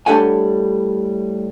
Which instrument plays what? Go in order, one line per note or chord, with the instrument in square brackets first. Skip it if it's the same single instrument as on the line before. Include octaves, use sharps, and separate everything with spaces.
[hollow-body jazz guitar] A2 G3 D4 A4 F#5 G#5